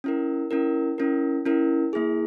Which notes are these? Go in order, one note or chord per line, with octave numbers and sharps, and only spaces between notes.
C#4 E4 A#4
C#4 E4 A#4
C#4 E4 A#4
C#4 E4 A#4
A#3 E4 G#4